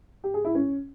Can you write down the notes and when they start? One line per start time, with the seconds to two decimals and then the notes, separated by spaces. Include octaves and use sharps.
0.24 G4
0.34 G#4
0.44 E4
0.55 C#4